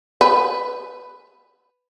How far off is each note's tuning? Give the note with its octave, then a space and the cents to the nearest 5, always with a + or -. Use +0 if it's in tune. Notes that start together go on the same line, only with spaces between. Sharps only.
B4 +10